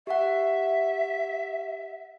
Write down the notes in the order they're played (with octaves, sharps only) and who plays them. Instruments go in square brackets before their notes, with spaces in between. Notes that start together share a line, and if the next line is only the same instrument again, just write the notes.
[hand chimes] G4 F#5 [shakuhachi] E5